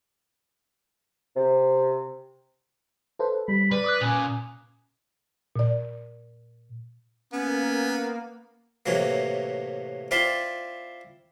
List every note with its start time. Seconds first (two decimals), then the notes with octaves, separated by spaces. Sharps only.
1.36 C3
3.19 A4 B4 C5
3.48 G3 B5
3.72 B4 D5
3.84 D6 D#6 F#6
4.01 A#2 C#4
5.56 A#2 D5
7.33 A#3 B3 C#4
8.86 A2 C3 E3 F#3 A#3
10.11 C4 E4 F4 D5 B5 C6